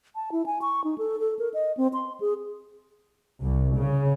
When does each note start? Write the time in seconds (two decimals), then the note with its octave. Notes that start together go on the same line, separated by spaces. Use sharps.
0.15 A5
0.32 E4
0.46 G#5
0.62 C#6
0.84 D#4
0.98 A4
1.20 A4
1.39 A#4
1.54 D#5
1.77 C4
1.93 C6
2.21 G#4
3.42 C2
3.78 C#3